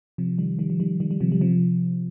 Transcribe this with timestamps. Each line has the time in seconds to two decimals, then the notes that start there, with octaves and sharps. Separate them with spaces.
0.18 C3 F3
0.38 D#3 G3
0.59 D#3 G3
0.70 F3
0.80 D#3 G3
1.00 D#3 G3
1.11 G3
1.21 C3 F3
1.32 G3
1.41 C3 F3